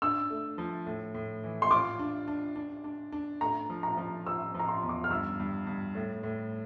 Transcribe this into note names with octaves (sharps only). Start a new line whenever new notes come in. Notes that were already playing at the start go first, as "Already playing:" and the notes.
D4 E6
A3
F3
A2
A2
E3
C6
F4 D6
D4
D4
D4
D4
D4
A3 A#5
F3
A#5
F3
F3 E6
F3 A#5
C6
E2
D6
F6
G2 E6
G2
G2
A2
A2